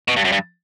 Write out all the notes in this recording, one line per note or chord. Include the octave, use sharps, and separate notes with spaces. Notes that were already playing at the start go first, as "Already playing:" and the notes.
B2
G2
F#2
G2